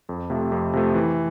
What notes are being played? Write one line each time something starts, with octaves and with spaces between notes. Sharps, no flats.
F2
C3 F3 A3
F2
C3 F3 A3
E3